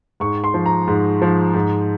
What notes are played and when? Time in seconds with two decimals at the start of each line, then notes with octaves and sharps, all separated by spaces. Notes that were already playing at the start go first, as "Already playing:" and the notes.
0.20 G#2 C#6
0.44 C6
0.54 F3
0.66 A#5
0.88 G#2
1.22 F3
1.54 G#2